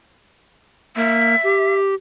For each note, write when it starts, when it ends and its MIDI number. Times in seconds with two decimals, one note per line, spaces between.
0.96 1.35 58
0.96 1.75 76
1.44 1.94 67